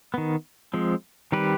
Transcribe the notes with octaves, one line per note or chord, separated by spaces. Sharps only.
D#3 B3
F3 G#3 C4
D#3 G3 C4 G4 B4